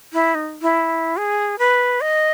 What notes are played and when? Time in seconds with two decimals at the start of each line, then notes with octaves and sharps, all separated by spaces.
0.13 E4
0.35 D#4
0.62 E4
1.17 G#4
1.58 B4
2.01 D#5